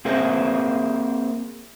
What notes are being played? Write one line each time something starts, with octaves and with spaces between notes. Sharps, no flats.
A#3 C4 G#4 A#4 C5 E5